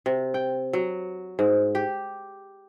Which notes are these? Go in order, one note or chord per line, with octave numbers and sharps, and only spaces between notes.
C3
G5
F#3
G#2
G4